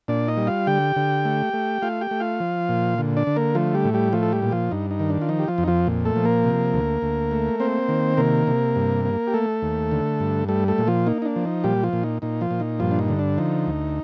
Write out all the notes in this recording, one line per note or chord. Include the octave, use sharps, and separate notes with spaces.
A#2 D4 D5
D#4 D#5
G3
F4 F5
D3 G4 G5
D3
A3
A3
A3 F4 F5
G4 G5
A3
F4 F5
F3
A#2
D3
D4 D5
D3
A#3 A#4
F3 A3 F4
G3 G4
A2
G3 G4
F3 A3 F4
A4
G3 G4
A#2
F3 F4
G2 D#4
D#4
D#3
D4
F4
F3 D#4
G4
F3 F4
F2
D#4
F3 F4
A#2
A3 A4
F3
A#3 A#4
C3
D2
D2
A3
A#3 C4 C5
D#3
C3 A#3 A#4
C3
G2
A#3
G4
A3 A4
D#2
D3
G2
G3 A3 A4
A3 A4
A#2
F3 F4
A#3 D#4
D#4
D4
F3
D#4
A#2 G3 G4
F3 F4
A#2
D#4
A#2 D#4
F3 F4
A#2
D#4
G2 F3 F4
D4
D#4
D3
D4
F3 D#4
D2